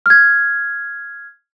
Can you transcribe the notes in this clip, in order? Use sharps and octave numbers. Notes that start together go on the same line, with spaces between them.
F6 G#6